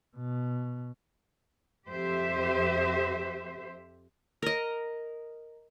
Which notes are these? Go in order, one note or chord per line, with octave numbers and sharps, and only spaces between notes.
B2
F2 G4 C5 E5
A#4 D#5